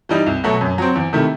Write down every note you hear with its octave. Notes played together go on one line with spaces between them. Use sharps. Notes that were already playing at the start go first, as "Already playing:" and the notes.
E3 G3 D#4
C2
B2 F#3 A3
F#2
F#3 C4
E2
C3 D#3 A3 E4